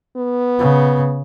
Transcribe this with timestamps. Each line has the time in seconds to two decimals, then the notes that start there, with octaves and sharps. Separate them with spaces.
0.17 B3
0.59 C#3